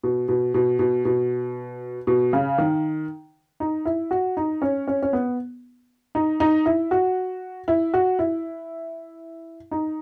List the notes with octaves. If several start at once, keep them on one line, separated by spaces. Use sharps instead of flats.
B2
B2
B2
B2
B2
B2
C#3
D#3
D#4
E4
F#4
D#4
C#4
C#4
C#4
B3
D#4
D#4
E4
F#4
E4
F#4
E4
D#4